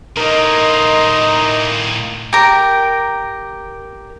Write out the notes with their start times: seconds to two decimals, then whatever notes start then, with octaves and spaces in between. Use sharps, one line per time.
0.17 A2 A#3 D#4 A#4 D#5 C6
2.33 G4 A#4